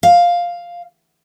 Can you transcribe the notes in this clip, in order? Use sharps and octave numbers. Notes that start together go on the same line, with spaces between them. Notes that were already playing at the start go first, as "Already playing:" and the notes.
F5